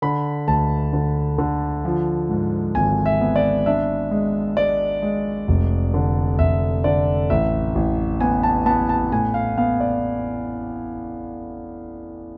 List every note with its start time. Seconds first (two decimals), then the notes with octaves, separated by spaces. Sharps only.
0.02 D3 B5
0.47 D2 A5
0.93 D3
1.38 D3
1.85 F3
2.29 G#2
2.75 G#1 G#5
3.06 E5
3.21 B3
3.36 D5
3.66 D4 E5
4.11 G#3
4.57 G#3 D5
5.02 G#3
5.48 F1
5.94 D3
6.39 F1 E5
6.84 D3 D5
7.30 A1 E5
7.75 A1
8.21 B3 G#5
8.43 A5
8.66 B3 A5
8.89 A5
9.12 A2 G#5
9.34 F5
9.58 B3 F5
9.80 D5